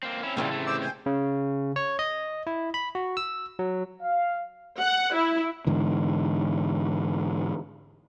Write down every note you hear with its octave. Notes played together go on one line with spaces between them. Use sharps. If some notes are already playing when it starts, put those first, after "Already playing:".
A#3 C4
C4 C#4 E4
A2 C#3 E3 G3 F4
C3 A3
C5 D6 E6
C5 G5 G#5
C#3
C#5
D#5
E4
B5
F#4
E6
F#3
F5
F#5
E4
G#2 D3 E3